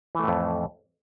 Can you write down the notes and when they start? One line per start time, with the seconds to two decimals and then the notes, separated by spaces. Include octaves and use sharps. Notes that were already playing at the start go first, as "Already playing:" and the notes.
0.15 E3
0.19 A3
0.24 A2
0.28 F2